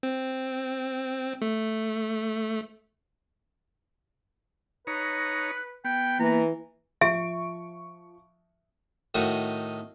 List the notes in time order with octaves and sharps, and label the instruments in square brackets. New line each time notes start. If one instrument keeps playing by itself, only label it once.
[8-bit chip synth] C4
A3
[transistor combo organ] D#4 C#5 A#5 [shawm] B4
[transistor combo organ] B3 [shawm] G5
[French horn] E3 [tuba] A#3 [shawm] A#5
[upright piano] F3 C#6 D7 [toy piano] E5
[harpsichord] A2 D#3 D#4 F#4